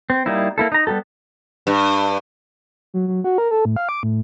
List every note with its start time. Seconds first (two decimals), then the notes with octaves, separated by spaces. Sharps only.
0.10 C4
0.26 G3 A#3 D#4 E4
0.58 A#3 E4 A4
0.72 D#4 A#5
0.87 G3 B3 G4 A4
1.67 G2
2.94 F#3
3.08 F#3
3.24 F#4
3.38 A#4
3.51 A4
3.65 A2
3.76 F5
3.89 D6
4.03 A2